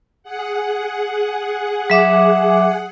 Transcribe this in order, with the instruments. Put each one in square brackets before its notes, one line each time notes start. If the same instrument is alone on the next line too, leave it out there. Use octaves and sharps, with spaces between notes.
[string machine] G#4 F#5
[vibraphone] F#3 E5 D6